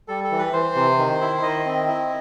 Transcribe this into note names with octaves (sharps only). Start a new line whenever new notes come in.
G3 A4
A4
E3
B4
E3 C5
C3
D#3
E4
D#3 D#5
C4
E4